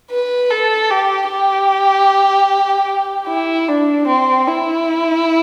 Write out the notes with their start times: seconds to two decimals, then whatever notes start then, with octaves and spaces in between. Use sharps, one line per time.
0.11 B4
0.51 A4
0.90 G4
1.30 G4
3.28 E4
3.68 D4
4.07 C4
4.47 E4